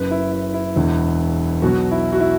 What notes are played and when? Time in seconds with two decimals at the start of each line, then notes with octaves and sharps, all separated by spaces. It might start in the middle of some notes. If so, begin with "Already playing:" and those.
Already playing: F#1 F#2 C#3 B4
0.11 E4
0.32 E4
0.54 E4
0.76 E1 E2 E3
1.62 B1 B2 F#3 F#4
1.91 E4
2.13 F#4
2.20 E4